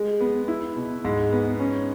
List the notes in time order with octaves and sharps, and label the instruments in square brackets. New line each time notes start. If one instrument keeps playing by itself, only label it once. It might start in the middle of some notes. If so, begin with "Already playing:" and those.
Already playing: [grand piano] G#3
B3
E4
B2
G#2
B3
C#4